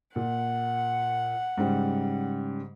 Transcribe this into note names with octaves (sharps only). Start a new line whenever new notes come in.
A#2 F#5
G#2 C#3 G3